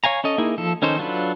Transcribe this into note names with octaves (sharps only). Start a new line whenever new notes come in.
C#5 F5 G#5 A#5
C#4 A4 D#5
A#3 D#4 E4 G#4
F3 A4
D#3 C#4 D#4 A4 C5
F#3 D4 F4 A4 B4